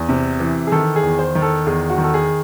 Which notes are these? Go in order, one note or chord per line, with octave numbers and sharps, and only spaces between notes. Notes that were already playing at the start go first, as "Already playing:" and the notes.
Already playing: E2
C3
E3
G#4
D#3 A4
G#4
E2
C5
D#3
A4
E2 G#4
F#4
D#3
A4
G#4